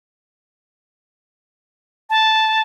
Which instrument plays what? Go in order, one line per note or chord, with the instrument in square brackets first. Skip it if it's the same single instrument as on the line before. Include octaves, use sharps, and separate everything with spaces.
[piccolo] A5